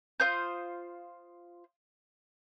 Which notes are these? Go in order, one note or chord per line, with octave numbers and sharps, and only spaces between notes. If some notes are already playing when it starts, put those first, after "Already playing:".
F4 C5 D#6 G6